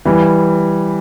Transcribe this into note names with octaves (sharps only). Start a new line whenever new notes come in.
E3 G3